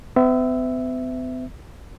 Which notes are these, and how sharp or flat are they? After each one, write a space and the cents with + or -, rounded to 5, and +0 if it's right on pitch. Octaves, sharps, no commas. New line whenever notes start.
B3 +45 E5 +0